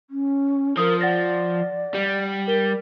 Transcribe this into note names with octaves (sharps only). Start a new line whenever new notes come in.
C#4
F3 A#4 D#6
D5 F#5 A6 A#6
G3
A#4 G7